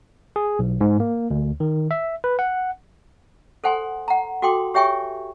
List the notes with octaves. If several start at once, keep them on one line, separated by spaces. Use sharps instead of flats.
G#4
B1
G#2
A#3
D2
D#3
E5
B4
F#5
A4 C5 F#5 G#5 C6
F#5 A#5
F#4 A4 G5 C6 D6
G4 C#5 E5 G5 G#5 C#6